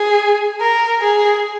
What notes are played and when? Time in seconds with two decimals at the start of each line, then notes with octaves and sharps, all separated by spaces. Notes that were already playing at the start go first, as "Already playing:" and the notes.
Already playing: G#4
0.61 A#4
1.01 G#4